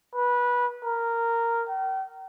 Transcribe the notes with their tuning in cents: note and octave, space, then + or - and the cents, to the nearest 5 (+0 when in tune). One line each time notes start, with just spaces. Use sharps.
B4 -20
A#4 -10
G5 -40